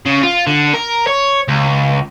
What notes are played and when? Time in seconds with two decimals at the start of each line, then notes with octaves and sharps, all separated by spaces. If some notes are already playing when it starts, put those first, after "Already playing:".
0.06 C#3
0.23 F4
0.47 D3
0.74 A#4
1.07 C#5
1.48 C#2